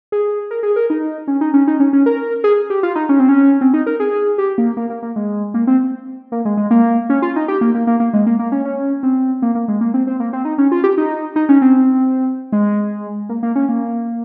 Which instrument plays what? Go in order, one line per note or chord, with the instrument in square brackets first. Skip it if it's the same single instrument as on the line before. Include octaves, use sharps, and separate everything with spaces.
[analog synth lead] G#4
A#4
G#4
A#4
D#4
C#4
D#4
C#4
D#4
C#4
C#4
A#4
G#4
G4
F4
D#4
C#4
C4
C#4
C4
D#4
A#4
G#4
G4
A#3
A#3
A#3
A#3
G#3
A#3
C4
A#3
G#3
G#3
A#3
C#4
F4
D#4
G4
A#3
A#3
A#3
A#3
G#3
A#3
A#3
C#4
C#4
C4
A#3
A#3
G#3
A#3
C4
C4
A#3
C4
D#4
C#4
F4
G4
D#4
D#4
C#4
C4
G#3
A#3
A#3
C#4
A#3